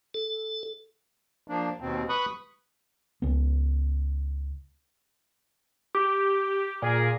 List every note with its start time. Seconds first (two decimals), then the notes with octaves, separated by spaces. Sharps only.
0.14 A4
1.48 F3 A#3 D4
1.81 D#2 B2 C4
2.09 B4 B5 C#6 D#6 F#6
3.22 C#2 B3
5.95 G4 D6
6.82 A#2 G#4 A#4